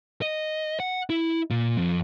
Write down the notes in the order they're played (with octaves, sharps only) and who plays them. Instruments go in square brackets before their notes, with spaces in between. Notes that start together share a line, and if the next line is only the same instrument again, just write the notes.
[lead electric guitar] D#5
F#5
E4
A#2
F2